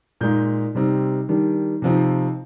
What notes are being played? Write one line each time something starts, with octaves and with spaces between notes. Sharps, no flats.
A#2 G#3 D#4 G6
C3 G3 C4 D#4
D#3 G3 D4
C3 F3 C4 D#4